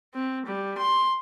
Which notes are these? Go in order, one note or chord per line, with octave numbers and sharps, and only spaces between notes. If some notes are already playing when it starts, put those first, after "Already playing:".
C4
G3
C6